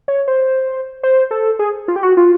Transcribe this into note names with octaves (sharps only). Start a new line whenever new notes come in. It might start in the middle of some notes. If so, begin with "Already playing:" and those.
C#5
C5
C5
A4
G#4
F4
G4
F#4
F4